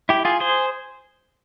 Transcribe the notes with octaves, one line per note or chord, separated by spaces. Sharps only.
E4 G4
F4 G#4
G#4 C5